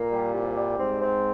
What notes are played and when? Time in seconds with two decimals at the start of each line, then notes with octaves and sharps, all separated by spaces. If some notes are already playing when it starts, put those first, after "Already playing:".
Already playing: A#2 A#3
0.11 G3
0.34 C2
0.56 G3
0.79 G#2 C4
1.01 C4